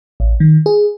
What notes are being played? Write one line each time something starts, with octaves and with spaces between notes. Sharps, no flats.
A1
D#3
G#4